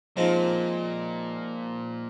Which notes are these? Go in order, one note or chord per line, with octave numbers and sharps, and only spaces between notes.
A#2 F3 G#3 C4 D#4